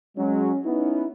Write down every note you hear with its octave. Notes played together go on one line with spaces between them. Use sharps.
F#3 G#3 C#4
B3 C#4 D#4 E4